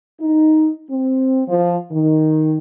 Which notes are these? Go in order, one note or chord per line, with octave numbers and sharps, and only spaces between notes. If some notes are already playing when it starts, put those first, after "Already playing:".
D#4
C4
F3
D#3